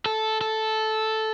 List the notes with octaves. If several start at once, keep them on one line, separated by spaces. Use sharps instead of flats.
A4
A4